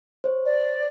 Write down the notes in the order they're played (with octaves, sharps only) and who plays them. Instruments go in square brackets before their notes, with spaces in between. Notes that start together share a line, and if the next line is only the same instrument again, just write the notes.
[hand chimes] C5 C#5
[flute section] D5